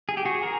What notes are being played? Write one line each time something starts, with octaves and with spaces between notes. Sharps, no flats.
G#4
G4
F#4 G#4
G#4 A#4